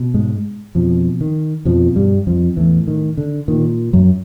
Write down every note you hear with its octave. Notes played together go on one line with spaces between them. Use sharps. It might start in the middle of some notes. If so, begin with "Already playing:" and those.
Already playing: B2
G#2 G#3
F2 B2 F3
D#3
F2 B2 F3
G2 G3
F2 F3
E2 A2 E3
D#3
D3
A#2 D#3
F#2 F#3